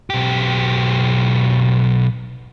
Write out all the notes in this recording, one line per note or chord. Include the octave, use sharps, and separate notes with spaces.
B1 G4